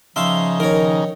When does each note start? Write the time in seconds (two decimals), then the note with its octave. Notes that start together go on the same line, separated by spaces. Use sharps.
0.16 C#3 F3 D#4 E5 F5 C6
0.60 D#3 A#4 C#5